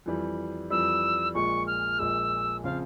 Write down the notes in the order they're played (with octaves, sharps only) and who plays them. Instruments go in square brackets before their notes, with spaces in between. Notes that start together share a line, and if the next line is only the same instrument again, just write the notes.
[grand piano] F2 E3 G3
[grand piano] F2 E3 G3 [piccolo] E6
[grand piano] A#1 A#2 G#3 [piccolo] C#6
[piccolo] F6
[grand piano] A#1 A#2 G#3 [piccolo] E6
[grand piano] C#3 F3 C4 F4 [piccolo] F5